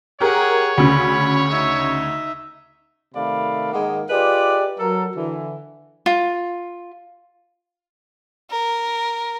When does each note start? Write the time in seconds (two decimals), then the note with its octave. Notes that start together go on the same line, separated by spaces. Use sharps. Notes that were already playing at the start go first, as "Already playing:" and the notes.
0.20 G4 G#4 A#4 C#5 F#5
0.77 D2 C#3 B5
1.51 D#4 E5
3.14 C3 D#3 A3 D5 F5 B5
3.73 G#2 D#3 G#3 A#3 D#5 F#5
4.09 F4 G4 G#4 B4 D5 D#5
4.79 F#3 A4 A#4
5.15 D3 E3
6.06 F4
8.51 A#4